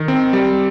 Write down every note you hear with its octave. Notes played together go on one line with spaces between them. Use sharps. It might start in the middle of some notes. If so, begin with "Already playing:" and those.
Already playing: D#3
C4
G3